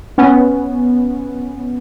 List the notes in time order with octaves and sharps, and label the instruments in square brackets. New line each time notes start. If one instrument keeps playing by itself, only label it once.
[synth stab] B3 C#4